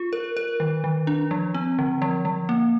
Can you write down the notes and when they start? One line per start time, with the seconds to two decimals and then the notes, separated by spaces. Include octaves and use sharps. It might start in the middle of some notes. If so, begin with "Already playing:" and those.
Already playing: F4
0.13 A#4
0.37 A#4
0.60 D#3
0.84 D#3
1.07 D4
1.31 F3
1.54 C4
1.79 D3
2.02 F3
2.25 F3
2.49 A#3